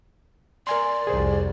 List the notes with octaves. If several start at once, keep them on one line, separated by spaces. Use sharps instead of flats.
A#4 D5 G#5 C6
C2 F2 G#4 C5